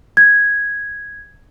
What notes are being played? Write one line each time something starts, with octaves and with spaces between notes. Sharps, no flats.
G#6